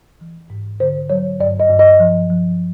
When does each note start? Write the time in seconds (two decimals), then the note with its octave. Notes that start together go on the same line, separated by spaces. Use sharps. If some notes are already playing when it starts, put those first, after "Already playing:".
0.21 E3
0.50 G#2
0.80 D3 C5
1.10 F#3 C#5
1.40 G2 D5
1.60 D#5
1.69 G2
1.79 D#5
1.99 F3
2.30 F3